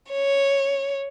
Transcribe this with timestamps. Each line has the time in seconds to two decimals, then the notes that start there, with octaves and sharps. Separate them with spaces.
0.12 C#5